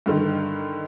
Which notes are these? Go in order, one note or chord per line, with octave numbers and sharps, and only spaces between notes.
G2 D3 D#3